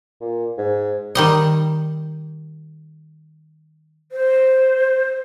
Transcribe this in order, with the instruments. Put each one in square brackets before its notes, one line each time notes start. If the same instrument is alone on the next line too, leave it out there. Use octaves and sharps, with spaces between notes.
[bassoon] A#2
G#2
[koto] D#3 G3 D#5
[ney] C5